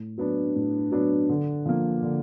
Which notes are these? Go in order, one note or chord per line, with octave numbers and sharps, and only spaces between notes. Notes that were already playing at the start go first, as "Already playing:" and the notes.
Already playing: A2
F#3 B3 D4
A2
F#3 B3 D4
D3
F3 A#3
D3